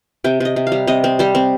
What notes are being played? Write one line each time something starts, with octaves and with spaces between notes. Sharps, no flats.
C3 G5
C3 D#5
C3
F5
G3
C3 D#5
C4
G3 C5
C4